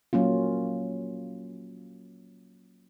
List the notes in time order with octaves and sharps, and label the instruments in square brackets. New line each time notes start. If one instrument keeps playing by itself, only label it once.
[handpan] F#3 A#3 C#4 F4